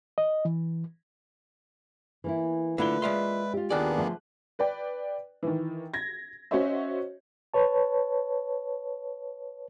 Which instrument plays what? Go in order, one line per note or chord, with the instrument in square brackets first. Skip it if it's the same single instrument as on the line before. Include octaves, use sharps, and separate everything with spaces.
[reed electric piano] D#5
E3
[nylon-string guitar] E3 A#3 E4
[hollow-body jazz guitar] D3 E4 [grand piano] A3 G7 [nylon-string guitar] A#3 F4 [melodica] B4
[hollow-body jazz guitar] G#3 F5 C6 [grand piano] D5 E5
[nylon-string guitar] F4 G4
[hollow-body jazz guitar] D#2 D5 [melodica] A#3 B3 D4 [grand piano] G#4 B4 F#6
[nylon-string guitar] D3 F3 A3
[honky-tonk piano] B4 D5 G5
D#3 E3
G#6 A#6
C#4 F#4 C5 C#5 D#5 E5
[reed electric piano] B4 C#5 A5